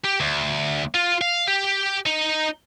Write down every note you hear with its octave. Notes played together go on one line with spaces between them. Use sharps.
G4
D2
F4
F5
G4
D#4